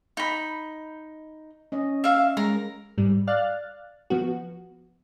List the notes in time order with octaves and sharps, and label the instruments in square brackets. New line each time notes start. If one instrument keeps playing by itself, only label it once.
[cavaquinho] D#4 B5
[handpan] C#4 D#5
[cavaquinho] E5 F5
[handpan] G#3 [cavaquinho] A#4
[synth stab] G#2 G3
D5 F5 F6 F#6 A6
F3 B3 F#4